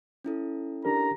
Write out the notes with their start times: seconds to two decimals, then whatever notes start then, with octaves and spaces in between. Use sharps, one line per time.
0.24 C#4 E4 A4
0.85 D4 G4 A#4 A#5